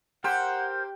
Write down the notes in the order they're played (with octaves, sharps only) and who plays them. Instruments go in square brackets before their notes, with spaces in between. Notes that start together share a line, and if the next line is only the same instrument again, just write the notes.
[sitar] G4 [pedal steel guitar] A#4 C5 G5 [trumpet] F#5